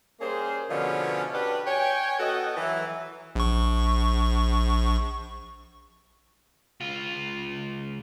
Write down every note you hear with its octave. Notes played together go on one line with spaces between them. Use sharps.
G3 A#3 C#4 G#4 C5
B2 D3 F3 B3 C#4 G#4
D4 F#4 G4 B4
C#5 G5 G#5
B3 F#4 A4 D#5
E3 F#3
A#1 C#6
C#2 F4